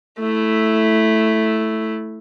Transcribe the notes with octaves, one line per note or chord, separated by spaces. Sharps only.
A3 E4